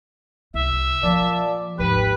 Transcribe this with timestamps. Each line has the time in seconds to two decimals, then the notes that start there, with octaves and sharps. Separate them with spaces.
0.54 C2 E5
1.03 A#2 F3 D5 A5
1.78 G#1 D#2 G4 B4 F#6